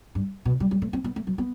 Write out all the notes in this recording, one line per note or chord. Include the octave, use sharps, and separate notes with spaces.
G2
B2
G3
G3
A3
C4
B3
A3
F#3
B3